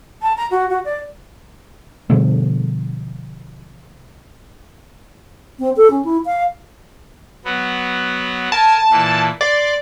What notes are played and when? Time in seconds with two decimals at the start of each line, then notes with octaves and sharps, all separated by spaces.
0.22 A5
0.37 A#5
0.51 F#4
0.69 F#4
0.85 D5
2.09 B2 D3 F3 G3
5.59 C4
5.76 A4
5.90 C#4
6.05 E4
6.26 F5
7.45 F#3 B3
8.52 A#4 G#5 A5
8.91 A#2 E3
9.41 D5 C6